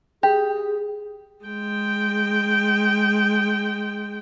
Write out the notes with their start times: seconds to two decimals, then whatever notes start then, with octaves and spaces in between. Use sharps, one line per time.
0.23 G4 G#4
1.45 G#3 G5